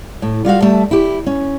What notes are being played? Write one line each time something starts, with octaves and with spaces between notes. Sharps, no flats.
A2
G3 F4 F#4 F5
G3 A3 E5 A5
E4 G4
C#4